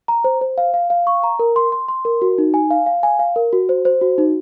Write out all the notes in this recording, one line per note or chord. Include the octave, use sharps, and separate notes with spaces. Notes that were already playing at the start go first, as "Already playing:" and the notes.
A#5
C5
C5
F5
F5
F5
C#6
A#5
A#4
C6
C6
C6
A#4
F#4
D#4
G#5
F5
F5
G#5
F5
A#4
F#4
C5
C5
F#4
D#4